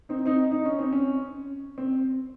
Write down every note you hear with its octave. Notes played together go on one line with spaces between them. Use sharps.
C4 D#4
C4 D#4
D#4
C#4
C4
C#4
C4